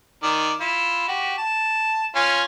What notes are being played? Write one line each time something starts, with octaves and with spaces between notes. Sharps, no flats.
D#3 A#4 D5
E4 F4
F#4 G4
A5
C#4 F4 G#5